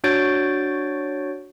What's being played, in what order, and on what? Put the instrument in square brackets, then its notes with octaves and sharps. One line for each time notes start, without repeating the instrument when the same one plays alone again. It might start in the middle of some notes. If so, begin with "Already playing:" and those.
[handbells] D4 F#4 C#5 G6 A6 D7